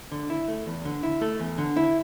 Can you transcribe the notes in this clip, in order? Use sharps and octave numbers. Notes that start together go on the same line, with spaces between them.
D3
E4
A3
E2
D3
E4
A3 A4
E2
D3
E4